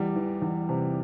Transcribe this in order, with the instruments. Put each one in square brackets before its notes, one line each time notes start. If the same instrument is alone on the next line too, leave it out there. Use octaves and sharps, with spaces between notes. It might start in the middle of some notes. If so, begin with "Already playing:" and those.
Already playing: [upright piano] E2 G3
E3
E2
C3